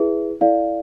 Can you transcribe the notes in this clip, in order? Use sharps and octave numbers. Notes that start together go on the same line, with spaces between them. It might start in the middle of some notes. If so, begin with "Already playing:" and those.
Already playing: E4 G#4 B4 E5
E4 A4 D5 F5